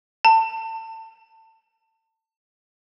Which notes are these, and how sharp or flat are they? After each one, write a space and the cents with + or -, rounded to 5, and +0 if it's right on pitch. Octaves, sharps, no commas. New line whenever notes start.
A5 +25